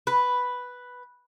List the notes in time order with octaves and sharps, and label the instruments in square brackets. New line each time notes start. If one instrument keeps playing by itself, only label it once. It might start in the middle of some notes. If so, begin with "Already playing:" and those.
[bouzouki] B4